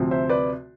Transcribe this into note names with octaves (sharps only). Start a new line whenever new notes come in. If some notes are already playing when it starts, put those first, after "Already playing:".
Already playing: D2 C3 F3 C4
C5 E5
B4 D5